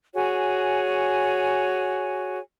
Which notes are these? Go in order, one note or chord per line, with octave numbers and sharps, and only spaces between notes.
F#4 G#4 C#5 G#5